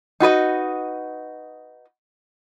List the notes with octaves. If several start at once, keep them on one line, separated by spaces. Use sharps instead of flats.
D#4 F#4 B4 D#5